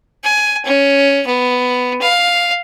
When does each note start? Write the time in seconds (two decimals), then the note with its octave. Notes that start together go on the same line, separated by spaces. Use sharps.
0.24 G#5
0.65 C#4
1.27 B3
2.02 F5